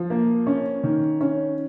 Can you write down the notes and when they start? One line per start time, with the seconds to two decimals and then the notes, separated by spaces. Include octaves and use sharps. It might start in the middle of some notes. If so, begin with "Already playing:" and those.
Already playing: F3
0.10 A#3
0.47 C#4
0.83 D#3
1.21 C#4